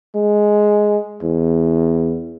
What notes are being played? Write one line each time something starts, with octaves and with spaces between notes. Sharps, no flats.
G#3
E2